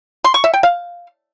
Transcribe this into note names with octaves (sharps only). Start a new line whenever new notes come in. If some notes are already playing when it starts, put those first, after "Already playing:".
C6
C#6
E5
G5
F5